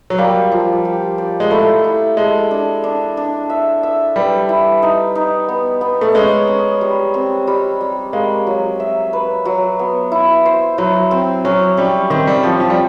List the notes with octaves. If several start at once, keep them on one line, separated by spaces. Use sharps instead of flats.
F#3
G3 A#3
F3
G4
D5
G#3
A3 E4
E4
G#3 A4
D4
D4
D4
E5
E5
G3 B4
E4
D#4
D#4
B3
B3
A3
G#3 C#4
C#4
G3
C4
G3
G3
G#3 A#3
F#3
E5
B4
F#3
B3
E4
C5
F#3 E4
C4
F#3 C#4
G3 C#4
D#3 C4
G3
F3 C4
F3
G3